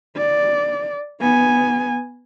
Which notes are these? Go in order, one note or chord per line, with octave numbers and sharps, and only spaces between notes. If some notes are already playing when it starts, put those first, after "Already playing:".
D5
B3 G#5